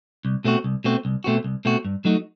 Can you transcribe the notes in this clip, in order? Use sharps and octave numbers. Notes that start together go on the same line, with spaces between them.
C2
B2 A3 C4 F#4
C2
B2 A3 C4 F#4
C2
B2 A3 C4 F#4
C2
B2 A3 C4 F#4
G2
F#3 A3 D#4 F#4